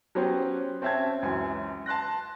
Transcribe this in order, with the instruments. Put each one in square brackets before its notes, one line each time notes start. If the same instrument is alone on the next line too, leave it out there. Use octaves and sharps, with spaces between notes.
[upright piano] F#3 B3 C#4 G4 C5
C4 C#4 E5 A5 G#6
C#2 F#2 E3 E5 G#5
A5 C6 F#6 A#6